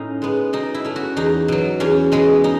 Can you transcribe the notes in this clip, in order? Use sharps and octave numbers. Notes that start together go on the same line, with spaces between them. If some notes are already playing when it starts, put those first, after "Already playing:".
Already playing: A2 C#4 D#4
G#3 B3
B2 D#4
E4
A3 C#4
F#4
E2 D#4
B2 F#3
E2 C#4
B2 G#3 B3
D#4